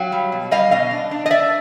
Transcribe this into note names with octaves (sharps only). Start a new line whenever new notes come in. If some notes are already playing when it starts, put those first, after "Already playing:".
Already playing: F#3 F5 G5
G3
B2
G3 D#5 F5
B2 D#5 F5
D4
D4
D#5
D4 D5 E5